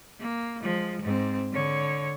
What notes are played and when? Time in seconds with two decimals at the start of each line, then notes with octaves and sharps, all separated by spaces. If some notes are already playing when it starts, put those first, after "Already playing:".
0.20 A#3
0.62 F3 G#3
1.02 G#2 C4
1.52 D3 C#5